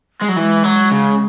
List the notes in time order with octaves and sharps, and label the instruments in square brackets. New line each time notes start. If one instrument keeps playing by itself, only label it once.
[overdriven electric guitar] G#3
F#3
[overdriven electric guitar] E3 [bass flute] G#3
[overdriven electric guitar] F#3
C#3